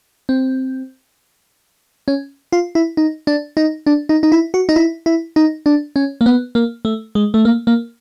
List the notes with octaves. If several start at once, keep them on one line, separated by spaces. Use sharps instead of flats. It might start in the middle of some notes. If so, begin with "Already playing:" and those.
C4
C#4
F4
E4
D#4
D4
D#4
D4
D#4
D#4
E4
F#4
D#4
E4
E4
D#4
D4
C#4
A#3
B3
A#3
A3
G#3
A3
A#3
A#3